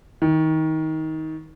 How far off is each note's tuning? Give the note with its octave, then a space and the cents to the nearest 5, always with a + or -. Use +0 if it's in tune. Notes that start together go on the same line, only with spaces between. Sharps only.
D#3 +25